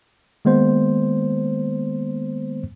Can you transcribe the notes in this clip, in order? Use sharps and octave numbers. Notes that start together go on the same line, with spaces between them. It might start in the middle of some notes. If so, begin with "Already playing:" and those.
D#3 G#3 A#3 B3 C5